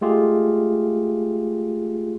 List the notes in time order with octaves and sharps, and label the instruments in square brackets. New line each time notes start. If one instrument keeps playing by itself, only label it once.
[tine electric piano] G#3 A3 F4 G4 G#4